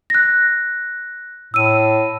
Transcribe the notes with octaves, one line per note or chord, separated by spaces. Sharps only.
F#6 A#6
A2 E6 D#7